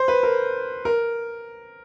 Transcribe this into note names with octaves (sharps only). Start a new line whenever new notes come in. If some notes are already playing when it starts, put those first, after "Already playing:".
Already playing: C5
B4
A#4
A#4